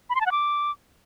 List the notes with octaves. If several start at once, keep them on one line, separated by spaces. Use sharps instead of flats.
B5
C6
A5
F#5
D6